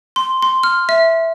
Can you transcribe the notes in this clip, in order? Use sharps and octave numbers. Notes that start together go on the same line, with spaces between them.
C6
C6
F6
E5